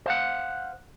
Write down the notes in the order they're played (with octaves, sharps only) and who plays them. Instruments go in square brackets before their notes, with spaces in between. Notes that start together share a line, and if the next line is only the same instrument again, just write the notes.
[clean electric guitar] C5 F5 F#5